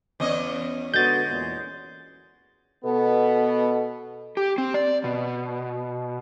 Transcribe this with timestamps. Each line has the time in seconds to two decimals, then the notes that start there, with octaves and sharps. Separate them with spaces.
0.20 E2 C#4 D#5
0.94 D3 G#3 B3 F#4 G6 A6
1.29 E2 A#2
2.85 B2 B3 A4
4.37 G4
4.58 C4
4.74 D5
5.04 B2